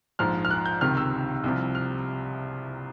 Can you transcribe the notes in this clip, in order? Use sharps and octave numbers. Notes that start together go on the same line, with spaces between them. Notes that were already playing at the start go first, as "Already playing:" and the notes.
A#1 G#2 F3 F6
F6
F#6
G6
C#2 C3 D#3 F6
E6
C2 C3 F3
F6